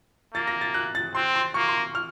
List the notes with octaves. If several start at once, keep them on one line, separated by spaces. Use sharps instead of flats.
A#3 A6
A#6
A6
F#6
A6
C4 C6
C6
A#3 C#6
C6
F6